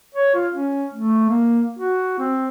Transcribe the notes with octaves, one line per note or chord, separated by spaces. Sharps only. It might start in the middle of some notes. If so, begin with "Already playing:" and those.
C#5
F4
C#4
A3
A#3
F#4
C4